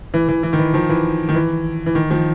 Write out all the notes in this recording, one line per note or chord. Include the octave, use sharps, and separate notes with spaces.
E3
E3
E3
D#3
E3
D#3 F3
E3
D#3
E3
E3
D#3
D#3 F3